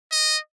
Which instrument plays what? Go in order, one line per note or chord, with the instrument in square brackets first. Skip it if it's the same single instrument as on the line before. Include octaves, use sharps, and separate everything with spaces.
[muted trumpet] D#5